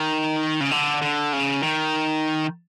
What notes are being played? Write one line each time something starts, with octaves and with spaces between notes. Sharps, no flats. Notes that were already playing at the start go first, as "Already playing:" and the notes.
Already playing: D#3
C#3
D3
D3
C#3
D#3